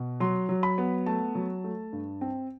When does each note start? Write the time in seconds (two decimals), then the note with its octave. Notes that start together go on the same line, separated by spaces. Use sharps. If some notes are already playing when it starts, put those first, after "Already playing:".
Already playing: B2
0.20 F#3 C6
0.49 F#3
0.63 B5
0.78 B3
1.06 A3 A5
1.35 F#3
1.64 A3
1.92 G2
2.21 C4